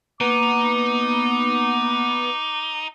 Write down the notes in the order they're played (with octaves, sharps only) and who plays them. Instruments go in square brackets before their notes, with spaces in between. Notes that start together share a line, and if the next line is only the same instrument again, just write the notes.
[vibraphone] A#3 A#5 [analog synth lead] B3 [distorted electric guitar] D#4 [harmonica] D6